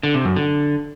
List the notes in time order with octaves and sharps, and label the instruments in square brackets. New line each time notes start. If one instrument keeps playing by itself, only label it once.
[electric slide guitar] D3
C3
F#2
D3